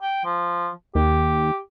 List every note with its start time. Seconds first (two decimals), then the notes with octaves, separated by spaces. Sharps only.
0.02 G5
0.25 F3
0.95 D#2 G4